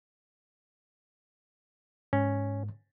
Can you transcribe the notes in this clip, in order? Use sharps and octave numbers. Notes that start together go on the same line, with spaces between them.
G#2 C#4